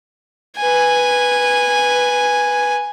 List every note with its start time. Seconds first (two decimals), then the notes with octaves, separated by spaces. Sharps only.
0.58 B4 G#5